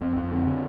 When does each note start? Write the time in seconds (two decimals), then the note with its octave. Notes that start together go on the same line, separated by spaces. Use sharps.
0.01 F2 C4
0.16 F2
0.31 D3 C4
0.46 D3